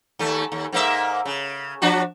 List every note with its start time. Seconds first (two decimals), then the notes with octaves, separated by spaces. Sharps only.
0.19 D#2 A3
0.52 D#2
0.73 G#2 A#3 E5
1.25 C#3
1.82 F3 D4 F#4